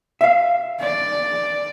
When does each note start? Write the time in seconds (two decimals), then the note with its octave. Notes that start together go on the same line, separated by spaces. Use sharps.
0.21 E5 F5
0.80 D5